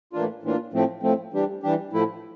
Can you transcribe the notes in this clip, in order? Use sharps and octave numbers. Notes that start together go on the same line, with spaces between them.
A2 E3 A#3 D4 F4
A2 E3 A#3 D4 F4
A2 F3 A3 C4
A2 F3 A3 C4
E3 G3 D4 G4
E3 G3 D4 G4
A2 F3 A3 E4